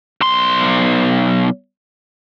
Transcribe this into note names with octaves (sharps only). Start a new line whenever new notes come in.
B1 C6